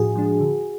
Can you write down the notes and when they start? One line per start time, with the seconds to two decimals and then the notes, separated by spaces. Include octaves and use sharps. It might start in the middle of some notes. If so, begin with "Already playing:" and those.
Already playing: A2 F3 D4 F#4 G#4
0.16 F3 G#3 D4
0.41 D3